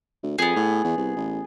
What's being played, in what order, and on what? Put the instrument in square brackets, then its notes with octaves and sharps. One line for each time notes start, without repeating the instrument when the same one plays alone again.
[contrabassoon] D2
[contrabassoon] F2 [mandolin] B3 G#4
[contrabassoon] A2
E2
C2
A1